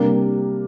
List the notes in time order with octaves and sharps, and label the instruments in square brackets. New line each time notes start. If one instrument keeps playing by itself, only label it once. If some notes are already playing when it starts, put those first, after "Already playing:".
Already playing: [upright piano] C3 G3 A#3 D4